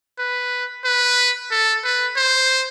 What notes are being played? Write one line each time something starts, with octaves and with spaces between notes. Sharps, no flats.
B4
B4
A4
B4
C5